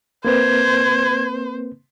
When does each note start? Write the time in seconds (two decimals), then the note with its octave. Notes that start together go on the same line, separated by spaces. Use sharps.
0.25 A#3 C4 B4 C5 G#6